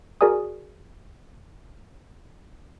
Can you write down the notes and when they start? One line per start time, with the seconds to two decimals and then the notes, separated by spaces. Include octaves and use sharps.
0.21 F#4 G#4 A#4 D5 G#5 D#6